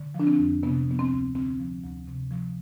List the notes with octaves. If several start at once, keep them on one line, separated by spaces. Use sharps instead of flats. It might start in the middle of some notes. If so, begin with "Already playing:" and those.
Already playing: D3
F3
D4
C4
F2
C3 B3
F3 B3
C4
D2
D3 C4
F3
D2
C3
F3